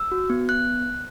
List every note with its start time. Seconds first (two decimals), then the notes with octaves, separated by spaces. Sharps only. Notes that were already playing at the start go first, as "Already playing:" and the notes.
Already playing: E6
0.12 F#4
0.30 B3
0.49 B3 F#6